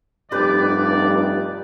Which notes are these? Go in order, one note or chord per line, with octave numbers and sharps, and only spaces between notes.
F1 G2 D#4 G4 B4 D5